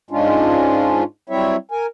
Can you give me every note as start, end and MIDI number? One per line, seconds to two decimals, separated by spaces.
0.11 1.03 44
0.11 1.03 56
0.11 1.03 61
0.11 1.03 62
0.11 1.03 65
1.29 1.56 54
1.29 1.56 55
1.29 1.56 60
1.29 1.56 64
1.29 1.56 73
1.29 1.56 76
1.71 1.86 70
1.71 1.86 80